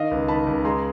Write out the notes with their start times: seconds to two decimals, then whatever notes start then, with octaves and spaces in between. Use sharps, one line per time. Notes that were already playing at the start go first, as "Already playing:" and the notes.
Already playing: D#3 D#5 F5
0.11 C#2
0.28 D#3 A5 B5
0.46 C#2
0.64 G#3 A#5 C6